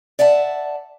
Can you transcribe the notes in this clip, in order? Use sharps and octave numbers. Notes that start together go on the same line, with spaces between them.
D5 E5 F#5 A5